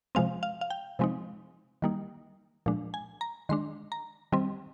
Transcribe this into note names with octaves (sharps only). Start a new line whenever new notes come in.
C3 F3 G#3 C4 F5
F5
F5
G5
C3 F3 G#3 C4 D#4
D#3 G3 A#3 D#4
A#2 F3 G#3 D4
G#5
A#5
D#3 G#3 D4 C6
A#5
D#3 G3 C4